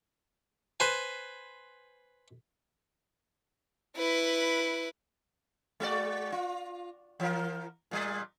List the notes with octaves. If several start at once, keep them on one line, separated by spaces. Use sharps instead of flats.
B4 C5 G#5
E4 B4
G#3 F#4 D5
F4
E3 A#4
A#2 G3